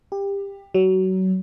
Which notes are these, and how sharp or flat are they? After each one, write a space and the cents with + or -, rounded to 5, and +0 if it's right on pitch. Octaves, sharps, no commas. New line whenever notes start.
G4 +20
F#3 +25